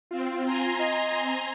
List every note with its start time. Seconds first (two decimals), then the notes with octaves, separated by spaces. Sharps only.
0.11 C4 F4
0.44 G#5 A#5 C6
0.79 D#5
1.12 C4